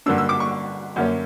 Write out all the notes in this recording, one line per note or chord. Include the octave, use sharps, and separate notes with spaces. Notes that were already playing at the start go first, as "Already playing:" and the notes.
G2 D3 F#3 A#3 D4 E6
E6
D6
C#6
F#2 D3 A#3 C#4